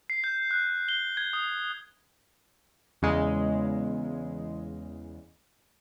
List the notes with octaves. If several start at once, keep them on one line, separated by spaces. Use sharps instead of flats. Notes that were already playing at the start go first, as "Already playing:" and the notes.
C7
G6
F#6
G7
G#6
D#6
E2 C#3 G#3